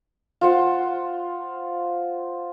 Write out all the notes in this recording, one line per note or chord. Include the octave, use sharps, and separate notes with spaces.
F4 C5 F#5